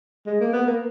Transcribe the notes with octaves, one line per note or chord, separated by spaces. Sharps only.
G#3
A#3
B3
A#3